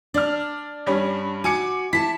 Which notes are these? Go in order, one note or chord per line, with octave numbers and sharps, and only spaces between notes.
D4 D5 F6
G2 G3 C#4
F#4 G#5 D6 C#7
E4 A5 B6